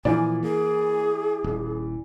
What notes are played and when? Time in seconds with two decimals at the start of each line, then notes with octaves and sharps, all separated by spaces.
0.05 A#2 E3 F3 D5 G#5
0.43 A#3 G#4
1.44 D#1